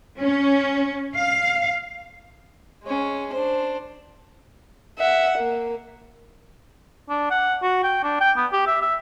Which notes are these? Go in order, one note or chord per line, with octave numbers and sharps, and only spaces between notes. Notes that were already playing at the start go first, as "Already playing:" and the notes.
C#4
F5
G#3 C#4
D4 C5
E5 F#5
A#3
D4
F#5
F#4
G5
D4
G5
B3
G4
E5
E5